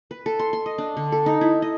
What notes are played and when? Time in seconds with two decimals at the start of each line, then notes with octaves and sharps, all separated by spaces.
0.11 B4
0.26 A4
0.39 C6
0.53 C6
0.66 D#5
0.78 D4
0.97 D3
1.12 A4
1.26 D#4
1.41 E4
1.62 D#5